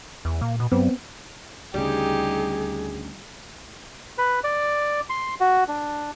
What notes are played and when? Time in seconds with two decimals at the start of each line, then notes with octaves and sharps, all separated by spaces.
0.25 E2
0.41 A#2 A#3
0.60 B2
0.72 G2 F#3 B3 C4
1.74 D2 C#3 G3 D#4 G4 G#4
4.18 B4
4.44 D5
5.10 C6
5.40 F#4
5.68 D4